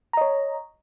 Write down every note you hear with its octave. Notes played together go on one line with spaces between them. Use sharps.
C#5 D#5 A#5